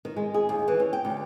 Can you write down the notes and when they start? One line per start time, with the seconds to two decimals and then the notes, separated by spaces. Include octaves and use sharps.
0.05 D#3
0.16 G#3
0.34 G#4
0.49 D#2
0.68 E3
0.80 C#4
0.93 G5
1.05 D2